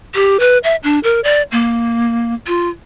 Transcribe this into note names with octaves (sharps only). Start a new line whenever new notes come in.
G4
B4
E5
D4
A#4
D5
A#3
F4